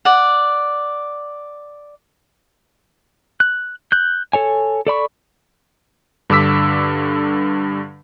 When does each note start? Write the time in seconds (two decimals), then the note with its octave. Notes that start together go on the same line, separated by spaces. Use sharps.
0.05 D5 F#5
3.40 F#6
3.92 F#6 G6
4.33 A4 C#5 G#5
4.87 A4 D5 B5 C#6
6.30 G2 D3 D6 E6 B6